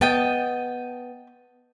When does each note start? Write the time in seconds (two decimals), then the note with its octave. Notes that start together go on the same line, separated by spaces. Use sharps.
0.01 B3 D#5 G5 A5